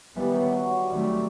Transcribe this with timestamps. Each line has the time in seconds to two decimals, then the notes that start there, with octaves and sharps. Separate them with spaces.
0.16 D#3 E3 G3 B3
0.35 F#3
0.53 F#3
0.65 F#3
0.77 G3
0.90 D#3 F#3 G3 A3 C4
1.03 G3